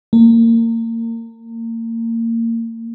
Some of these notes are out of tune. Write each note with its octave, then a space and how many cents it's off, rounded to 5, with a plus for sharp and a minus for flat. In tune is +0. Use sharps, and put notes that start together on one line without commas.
A#3 -30